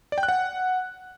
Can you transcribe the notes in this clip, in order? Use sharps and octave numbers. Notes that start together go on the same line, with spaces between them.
D5
G5
F#6
F#5